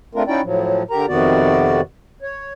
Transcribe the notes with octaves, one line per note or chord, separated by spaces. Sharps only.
A3 C4 D4 F4 A#4
C#4 D#4 E4 F#4 D5 G5
A2 F3 F#3
D3 G4 A#4 A#5
F2 C3 D#3 B3 F#4 D5
C#5